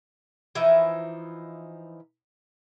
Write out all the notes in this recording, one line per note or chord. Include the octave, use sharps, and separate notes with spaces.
E3 F3 D#4 E5